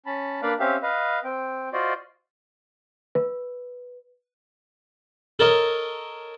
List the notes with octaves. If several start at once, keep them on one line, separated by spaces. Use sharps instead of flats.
C#4 A5 B5
A#3 D4 B4 D5 F5 B5
C4 C#4 G4 E5 F5
B4 D#5 F5
C4 G5
F4 F#4 C5 D5 D#5
B4
A4 A#4 C#5 D#5